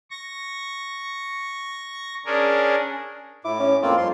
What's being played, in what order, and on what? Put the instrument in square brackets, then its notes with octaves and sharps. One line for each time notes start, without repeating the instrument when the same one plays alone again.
[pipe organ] C#6 A#6
C#4 D4 G#4 A#4
[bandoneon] A2 D6 [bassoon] E4
[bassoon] C#4
[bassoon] F2 [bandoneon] A#3 C4 F4
[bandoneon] G2 F4 C6